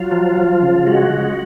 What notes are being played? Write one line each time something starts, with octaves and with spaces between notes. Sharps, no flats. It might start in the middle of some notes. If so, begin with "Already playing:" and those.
Already playing: F#3 F4
F3
F3
C#3
G#3 F#4
G#3